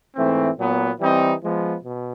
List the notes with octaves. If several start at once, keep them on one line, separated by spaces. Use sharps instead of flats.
G#2 E3 A3 C4
A#2 F#3 B3
E3 G3 C4 D#4
F3 G#3 B3
B2